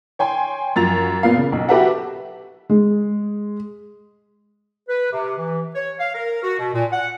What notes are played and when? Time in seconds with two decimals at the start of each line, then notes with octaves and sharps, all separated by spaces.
0.19 C#5 G5 G#5 C6
0.76 F#2 F3 A6 F7
1.23 A#2 B3 F4 F5
1.37 C#3
1.52 B1
1.69 F#4 G4 A4 B4 E5 F#5
2.69 G#3
4.89 B4
5.12 C3
5.38 E3
5.75 C#5
6.00 F5
6.15 A#4
6.43 F#4
6.59 B2
6.74 A#2
6.92 F#5